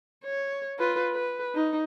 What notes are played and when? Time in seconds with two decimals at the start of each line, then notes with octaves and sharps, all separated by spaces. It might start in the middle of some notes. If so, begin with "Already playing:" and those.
0.24 C#5
0.78 F4 B4
1.13 B4
1.55 D#4